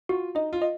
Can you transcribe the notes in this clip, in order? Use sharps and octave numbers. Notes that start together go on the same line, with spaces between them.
F4 F#4
D#4 D#5
F4
D#5